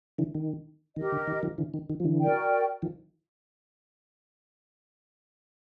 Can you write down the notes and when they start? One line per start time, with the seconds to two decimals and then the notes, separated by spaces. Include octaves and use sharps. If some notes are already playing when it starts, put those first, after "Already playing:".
0.18 D3 E3
0.35 D#3
0.96 D#3 G4 A#4 D#5
1.12 D3
1.27 D#3
1.43 D#3 F3
1.58 D3 E3
1.74 D#3
1.90 D#3
2.00 F3
2.04 D3 E3
2.21 F#4 A#4 D5 G5
2.82 D#3 F3